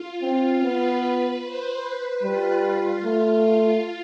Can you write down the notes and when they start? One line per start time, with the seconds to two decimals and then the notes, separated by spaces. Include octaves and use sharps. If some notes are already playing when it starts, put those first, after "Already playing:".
Already playing: F4
0.22 C4
0.63 B3 B4
1.43 C5
1.83 B4
2.23 G3 F4
2.64 F4
3.04 A3